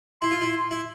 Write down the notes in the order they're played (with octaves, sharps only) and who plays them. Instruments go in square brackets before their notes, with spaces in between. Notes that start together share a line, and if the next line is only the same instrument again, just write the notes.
[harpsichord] E4 [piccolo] C6
[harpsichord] F4
E4
E4